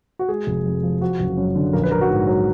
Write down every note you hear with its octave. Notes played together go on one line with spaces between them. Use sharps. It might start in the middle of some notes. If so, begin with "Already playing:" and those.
F#4
G#3 G#4
F1
F2
F3
F3 F#4
F#1
F#2
D3
A#1 A#4
B4
A#1 A#4
F#4
G#2 A#4
F#3